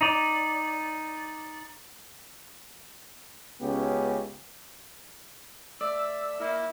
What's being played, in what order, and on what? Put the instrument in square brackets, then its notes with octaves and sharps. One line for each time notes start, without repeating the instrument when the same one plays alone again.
[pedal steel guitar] D#4 D5
[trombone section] C#2 B3 C#4 G4
[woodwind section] A3 E5 E6 [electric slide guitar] D5
[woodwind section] A#3 [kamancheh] E4